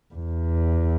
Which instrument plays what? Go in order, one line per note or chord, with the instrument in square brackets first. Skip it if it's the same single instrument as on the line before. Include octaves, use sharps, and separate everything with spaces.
[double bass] E2